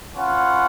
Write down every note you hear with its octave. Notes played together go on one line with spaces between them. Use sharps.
C#4 F4 B4 F#5